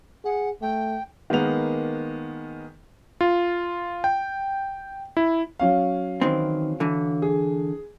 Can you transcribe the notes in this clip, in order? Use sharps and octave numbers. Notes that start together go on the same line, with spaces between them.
G#4 F#5
A3 G5
D#3 G#3 A#3 B3 F7
F4
G5
E4
F#3 C#4 F5
D#3 E3 C4
D3 E3
G#4